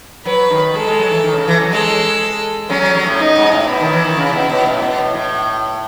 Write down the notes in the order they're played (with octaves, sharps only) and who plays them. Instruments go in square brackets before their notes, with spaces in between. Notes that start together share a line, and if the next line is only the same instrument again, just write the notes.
[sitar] F#3 [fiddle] B4
[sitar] D#3
[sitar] G#3 [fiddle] A4
[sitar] G#3
F#3
E3
D#3
C#3
E3
F#3
[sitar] G#3 [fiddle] A4
[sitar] F#3 [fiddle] C#4
[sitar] F#3
F#3
A2
[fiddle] D#4
[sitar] G#2
A2
[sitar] B2 [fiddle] E4
[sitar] D#3
E3
D#3
C#3
B2
B2
A2
B2
A2
A2